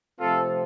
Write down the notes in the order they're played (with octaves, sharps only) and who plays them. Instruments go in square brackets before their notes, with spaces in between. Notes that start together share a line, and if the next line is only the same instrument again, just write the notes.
[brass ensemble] C3 F3 A3 C4 F4 A4